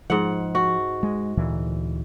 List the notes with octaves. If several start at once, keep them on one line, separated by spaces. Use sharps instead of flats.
G#2 F3 F#5
F#4
G#3
D2 A#2 E3